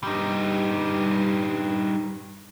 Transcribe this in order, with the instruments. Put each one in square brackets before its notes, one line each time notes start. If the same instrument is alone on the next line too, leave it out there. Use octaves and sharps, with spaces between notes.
[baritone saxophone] G2 [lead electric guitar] G3 D#4